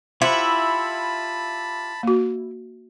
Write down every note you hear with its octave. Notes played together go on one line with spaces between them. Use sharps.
E4 F4 G4 C5 F#5 A5 B5
A#3 F#4